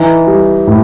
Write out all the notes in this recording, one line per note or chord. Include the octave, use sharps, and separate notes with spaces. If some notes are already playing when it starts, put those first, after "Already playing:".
Already playing: E3 D#4
G3
A2